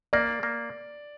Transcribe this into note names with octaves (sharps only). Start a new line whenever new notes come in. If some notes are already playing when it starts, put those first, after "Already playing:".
A#3 D5
A#3